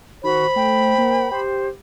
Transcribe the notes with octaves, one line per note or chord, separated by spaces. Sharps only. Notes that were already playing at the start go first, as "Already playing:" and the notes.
D#3 F#4 C5 B5
A3 G5
A#3
G4 C5